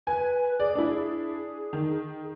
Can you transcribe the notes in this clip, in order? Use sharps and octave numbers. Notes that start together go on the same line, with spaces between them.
B4 G#5
G#4 D5
D4 E4
D#3